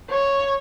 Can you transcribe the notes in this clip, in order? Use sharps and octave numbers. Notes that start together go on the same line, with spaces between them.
C#5